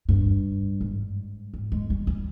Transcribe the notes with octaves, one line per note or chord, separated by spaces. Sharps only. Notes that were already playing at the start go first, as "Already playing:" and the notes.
G2
G#2
G3
G#3
G3
G3